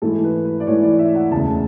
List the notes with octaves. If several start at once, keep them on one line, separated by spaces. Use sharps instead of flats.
G#2 E3 A3 E4 A4
B4
B4
D5
G#2 E3 A3 E4 C#5
D5
E5
F#5
E1 D2 C#3 A5